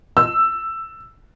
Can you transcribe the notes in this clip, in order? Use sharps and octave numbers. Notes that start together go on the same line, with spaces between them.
E6